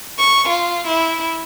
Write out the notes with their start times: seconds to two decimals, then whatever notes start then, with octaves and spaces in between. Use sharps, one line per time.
0.19 C#6
0.49 F4
0.88 E4